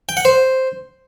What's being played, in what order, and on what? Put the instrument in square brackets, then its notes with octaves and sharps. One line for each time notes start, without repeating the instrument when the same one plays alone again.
[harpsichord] G5
F#5
C5